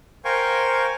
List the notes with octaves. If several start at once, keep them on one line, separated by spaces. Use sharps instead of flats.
A#4 C5 F5 G5 G#5 C#6